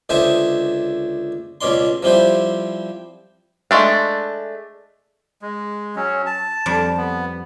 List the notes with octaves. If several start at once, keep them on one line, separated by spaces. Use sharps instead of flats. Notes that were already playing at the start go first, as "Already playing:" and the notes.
C#2 D3 G#4 C5 E5 G#5
C#2 B2 C#4 D5 C6
F3 G3 C4 E4 C5
G#3 A3 D4
G#3
F#3 C#4
A5
F2 G3
B3